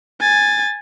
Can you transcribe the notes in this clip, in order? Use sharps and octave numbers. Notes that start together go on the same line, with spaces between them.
G#5 A6